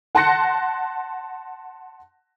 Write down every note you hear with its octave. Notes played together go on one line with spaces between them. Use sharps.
F#5 A5 C6 F#6 A#6 C#7